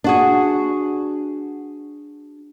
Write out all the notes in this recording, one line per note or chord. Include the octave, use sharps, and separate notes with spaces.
D4 F#4 G#4